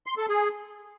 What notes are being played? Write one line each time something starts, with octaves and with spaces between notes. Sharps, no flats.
C6
A4
G#4